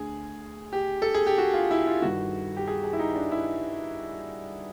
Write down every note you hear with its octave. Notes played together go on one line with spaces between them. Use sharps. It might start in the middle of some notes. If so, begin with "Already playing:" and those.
Already playing: D2 D3 G#4
G4
A4
G#4
G4
F#4
F4
E4
F4
G2 D#3 F#4
G4
G#4
G#4
E4
D#4
D4
E4